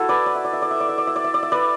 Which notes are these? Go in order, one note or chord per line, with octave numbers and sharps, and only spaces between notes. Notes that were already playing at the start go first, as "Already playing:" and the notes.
Already playing: E4 F#4 A4
B4 D5
D5
E5
D5
E5
D5
E5
D5
E5
D5
E5
D5
E5
D5
E5
B4 D5